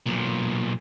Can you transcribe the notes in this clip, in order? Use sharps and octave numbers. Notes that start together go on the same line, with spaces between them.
B1 A#2